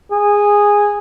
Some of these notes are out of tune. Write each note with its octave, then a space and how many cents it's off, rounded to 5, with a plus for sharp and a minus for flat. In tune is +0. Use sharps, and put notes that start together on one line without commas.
G#4 -10